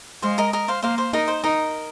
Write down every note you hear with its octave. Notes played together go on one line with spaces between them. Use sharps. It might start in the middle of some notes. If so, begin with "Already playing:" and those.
G#3 C5 F5
A#4 D#5
A#4 D#5
C5 F5
A#3 C5 F5
C5 F5
D#4 A#4 D#5
C5
D#4 A#4 D#5